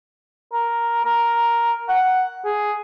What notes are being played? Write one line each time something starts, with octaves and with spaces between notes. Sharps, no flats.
A#4
A#4
F#5
G#4